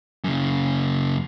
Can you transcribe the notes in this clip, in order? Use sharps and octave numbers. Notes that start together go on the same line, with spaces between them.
F#2 C#3